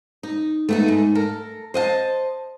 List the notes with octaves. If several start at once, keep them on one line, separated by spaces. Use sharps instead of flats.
D#4
A3 B3 D#4
G#2
A4 A#4
C5 D#5 F5 A5